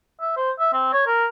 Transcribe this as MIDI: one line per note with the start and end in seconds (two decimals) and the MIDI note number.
0.21 0.35 76
0.37 0.51 72
0.59 0.69 76
0.73 0.93 60
0.93 1.04 73
1.07 1.26 70